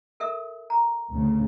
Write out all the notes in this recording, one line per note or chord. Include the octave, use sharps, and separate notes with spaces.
A4 A#4 E5
A#5
D2 C#3